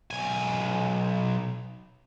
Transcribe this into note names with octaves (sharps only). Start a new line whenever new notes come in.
B1 G#5